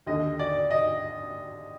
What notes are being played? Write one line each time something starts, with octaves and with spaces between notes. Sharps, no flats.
D#2 D3 D#5
D5
D#5